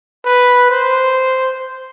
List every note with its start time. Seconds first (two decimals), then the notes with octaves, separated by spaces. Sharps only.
0.25 B4
0.70 C5